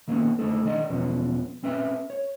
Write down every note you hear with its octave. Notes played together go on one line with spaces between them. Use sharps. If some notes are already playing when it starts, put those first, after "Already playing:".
D#3 A#3 B3 C#4 D#4
D3 A3 D#4 A4
D#3 D4 D5 D#5
E2 B2 F3 B3 C#4
C4 C#4 B4 E5
C#5